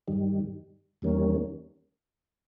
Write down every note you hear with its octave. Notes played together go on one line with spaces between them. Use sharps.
G2 D#3 G3
E2 D#3 G3 A#3 C#4